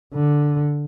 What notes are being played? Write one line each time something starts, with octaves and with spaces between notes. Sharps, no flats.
D3